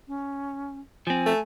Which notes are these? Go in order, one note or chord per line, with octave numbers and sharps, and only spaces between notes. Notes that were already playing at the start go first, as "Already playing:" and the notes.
C#4
F3 C4 G#5
A3